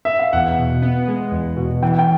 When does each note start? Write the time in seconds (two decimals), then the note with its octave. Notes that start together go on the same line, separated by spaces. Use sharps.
0.05 E5
0.19 F5
0.33 E2 F#5
0.59 B2
0.82 B3
1.08 G#3
1.32 E2
1.57 B2
1.83 E3 G5
1.99 G5